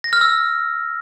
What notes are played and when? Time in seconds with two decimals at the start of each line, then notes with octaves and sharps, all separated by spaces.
0.04 A#6
0.13 F6
0.21 E6